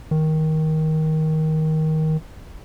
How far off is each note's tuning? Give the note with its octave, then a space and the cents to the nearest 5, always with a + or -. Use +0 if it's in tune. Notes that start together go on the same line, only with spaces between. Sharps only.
D#3 +15